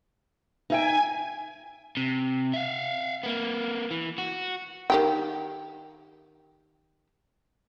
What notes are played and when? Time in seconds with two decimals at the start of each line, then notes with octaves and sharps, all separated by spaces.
0.70 D#4 E5 G5 G#5 G#6
1.97 C3
2.54 E5 F5
3.23 A#3 B3
3.91 E3
4.18 F#4
4.90 D#3 G4 G5